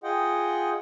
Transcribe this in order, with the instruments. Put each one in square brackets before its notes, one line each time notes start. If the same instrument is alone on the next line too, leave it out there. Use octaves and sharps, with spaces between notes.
[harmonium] F4 G#4 D#5 F#5 G5